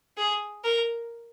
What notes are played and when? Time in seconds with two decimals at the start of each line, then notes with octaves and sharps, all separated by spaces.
0.17 G#4
0.64 A#4